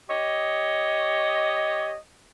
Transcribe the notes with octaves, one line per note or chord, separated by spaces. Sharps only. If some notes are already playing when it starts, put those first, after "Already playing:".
G4 C#5 D#5